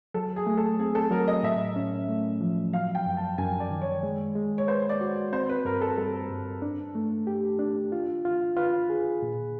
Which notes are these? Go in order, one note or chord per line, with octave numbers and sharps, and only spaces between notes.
F#3 A4
G#4
A3
A4
C4 G#4
A4
F#3 A#4
D#5
A2 E5
C#4
A3
F3
F#3 F5
G5
F#2
A5
F#2 G#5
D5
D#3
C#5
G#3
G#3
C#5
B4 C5
D5
F#4
C4 C5
B4
G2 A#4
A4
G3 A4
G2
D4
A3
G4
D4
F4
F4
F4 B4
G#4
A#2